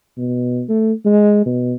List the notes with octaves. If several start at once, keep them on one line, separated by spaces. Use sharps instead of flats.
B2
A3
G#3
B2